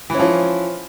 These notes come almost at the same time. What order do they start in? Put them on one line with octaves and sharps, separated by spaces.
E3 C#4 F3